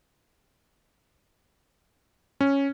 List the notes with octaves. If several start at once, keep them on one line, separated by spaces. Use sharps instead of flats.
C#4